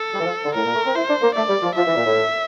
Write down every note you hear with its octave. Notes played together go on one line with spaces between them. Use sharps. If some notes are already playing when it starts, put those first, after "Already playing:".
Already playing: A4
G3
E3
F3
D3
A2 A#4
A#2
A3
C4
E4 C5
D4
A#3
A3 D5
G3
F3
F3 E5
E3
A#2
A2